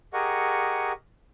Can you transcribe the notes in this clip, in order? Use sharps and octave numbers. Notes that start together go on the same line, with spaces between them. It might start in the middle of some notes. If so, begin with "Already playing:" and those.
G4 G#4 A#4 D#5 F#5 C#6